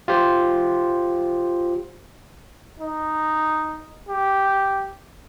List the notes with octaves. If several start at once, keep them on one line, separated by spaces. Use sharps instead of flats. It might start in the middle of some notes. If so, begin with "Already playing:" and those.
F4 G4 C5
D#4
G4